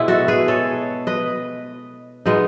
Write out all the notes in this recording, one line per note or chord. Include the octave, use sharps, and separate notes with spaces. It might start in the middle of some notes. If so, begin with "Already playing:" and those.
Already playing: B2 G#3 B3 E4
F#4 A4
G#4 B4
A4 C#5
B4 D#5
B2 G#3 B3 D#4